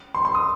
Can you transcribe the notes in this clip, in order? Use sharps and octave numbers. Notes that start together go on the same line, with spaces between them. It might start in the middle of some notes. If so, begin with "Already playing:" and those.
C6
C6
D#6